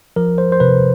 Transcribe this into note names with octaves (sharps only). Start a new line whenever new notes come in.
F3 A#4
C5
C5
C3 B4